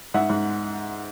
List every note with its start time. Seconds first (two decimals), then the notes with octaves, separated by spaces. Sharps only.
0.14 G#2 E5 F#5
0.29 G#2